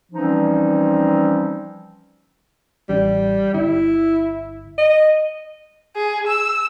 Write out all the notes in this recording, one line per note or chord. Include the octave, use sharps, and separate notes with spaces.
E3 F3 G3 C4 C#4 D#4
A1 G3
G1 E4
D#5
G#4
E6